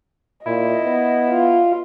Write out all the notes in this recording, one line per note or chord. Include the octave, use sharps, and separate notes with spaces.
A#2 E4 D#5
B3
F4